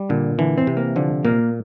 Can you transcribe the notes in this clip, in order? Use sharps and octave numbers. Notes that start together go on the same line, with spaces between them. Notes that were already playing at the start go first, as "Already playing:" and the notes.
Already playing: G3
A#2 D3
D3 E3
C4
C3
A#3
D3 F3
A#2 A#3